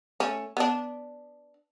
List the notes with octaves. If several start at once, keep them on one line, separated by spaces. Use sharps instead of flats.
A3 C#4
B3 D4